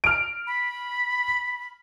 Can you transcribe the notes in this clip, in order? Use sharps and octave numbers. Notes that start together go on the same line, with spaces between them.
F6 D7
B5